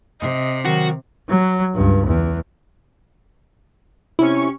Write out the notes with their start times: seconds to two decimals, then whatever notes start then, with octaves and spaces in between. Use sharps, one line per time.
0.20 C3 D#5
0.65 D#3 F#3 F#4
1.29 F#3
1.74 C#2 G2
2.07 E2
4.19 C3 C#4 E4 C#6